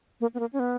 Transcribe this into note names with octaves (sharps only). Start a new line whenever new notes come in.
A#3
B3
A#3
C#4
B3